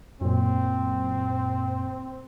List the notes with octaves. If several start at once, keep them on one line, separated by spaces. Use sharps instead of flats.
F#2 A#2 C4